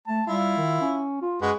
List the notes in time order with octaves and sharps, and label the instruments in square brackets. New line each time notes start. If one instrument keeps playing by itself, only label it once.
[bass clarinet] A3 [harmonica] A5
[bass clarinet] G3 [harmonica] E4 F4
[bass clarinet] D#3
C#4
F4
[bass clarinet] F#2 [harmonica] G#3 F#4 B4